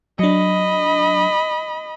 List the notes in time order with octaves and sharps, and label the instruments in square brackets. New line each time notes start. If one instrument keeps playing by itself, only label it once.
[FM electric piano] F#3 D4 [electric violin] D#5 B5